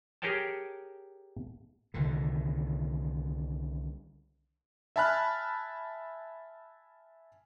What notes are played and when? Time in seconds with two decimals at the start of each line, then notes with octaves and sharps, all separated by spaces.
0.22 G4 G#4 A#4 C#5 G5 A5
1.94 C2 D3 D#3
4.96 E5 G#5 A5 B5 F6 F#6